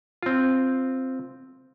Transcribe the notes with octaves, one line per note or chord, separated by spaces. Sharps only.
C4 F4